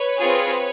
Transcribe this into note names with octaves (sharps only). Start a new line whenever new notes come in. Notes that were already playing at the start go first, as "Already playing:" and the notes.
Already playing: B4 C#5
C4 F4 G#4